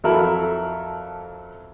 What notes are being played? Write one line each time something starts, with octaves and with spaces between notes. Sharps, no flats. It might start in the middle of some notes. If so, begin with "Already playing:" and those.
F2 F#3 E4 A4 A#4 B5